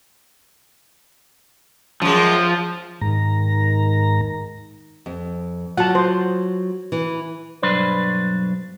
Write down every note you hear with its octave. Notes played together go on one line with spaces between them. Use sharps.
F#2 F3 G#3
G#2 D#3 A#5
F2
F#3 F4 F#4 F#5 A5
C5
E3
B1 G2 F#3 D4 B4 C5